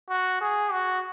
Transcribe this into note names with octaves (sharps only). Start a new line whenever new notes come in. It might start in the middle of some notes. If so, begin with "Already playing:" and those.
F#4
G#4
F#4